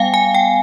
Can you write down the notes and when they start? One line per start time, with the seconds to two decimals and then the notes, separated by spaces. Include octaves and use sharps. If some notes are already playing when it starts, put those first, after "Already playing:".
Already playing: G3 B3 F5 G5 G#5
0.14 G#5
0.35 G5